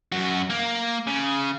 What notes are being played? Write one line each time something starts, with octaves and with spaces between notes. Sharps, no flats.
F#2 F#4
A#3
C#3